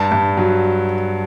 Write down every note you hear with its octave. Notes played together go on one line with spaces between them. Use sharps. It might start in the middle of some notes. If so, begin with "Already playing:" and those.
Already playing: G2 A5
G2
F#3